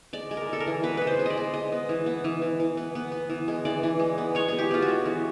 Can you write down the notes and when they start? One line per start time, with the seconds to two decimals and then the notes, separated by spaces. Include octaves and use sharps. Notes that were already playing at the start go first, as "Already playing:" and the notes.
0.13 G#3 D5
0.31 G#3
0.37 A#4
0.49 G#3 A4
0.60 A#4
0.67 E3
0.83 B3 B4
0.97 G#3 B4
1.07 C5
1.19 G#3
1.26 D5 D#5
1.37 G#3
1.54 G#3 D#5
1.72 B3
1.89 E3
2.06 B3
2.24 E3
2.42 E3
2.60 E3
2.77 B3
2.95 B3
3.12 B3
3.30 E3
3.48 G#3
3.65 E3 D5
3.83 E3
4.00 G#3
4.18 B3
4.35 G#3 C#5
4.48 B3 G#4
4.58 G4
4.71 B3 F4
4.82 F#4
4.88 G#3
5.05 E3